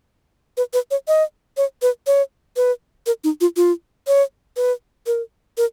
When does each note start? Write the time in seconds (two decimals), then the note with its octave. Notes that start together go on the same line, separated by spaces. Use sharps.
0.57 B4
0.73 B4
0.91 C#5
1.08 D#5
1.57 C#5
1.82 B4
2.07 C#5
2.57 B4
3.07 A#4
3.24 D#4
3.41 F4
3.57 F4
4.07 C#5
4.57 B4
5.07 A#4
5.58 A#4